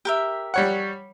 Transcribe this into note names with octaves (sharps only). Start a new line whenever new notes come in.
G4 A#4 E5
G3 C#5 F#5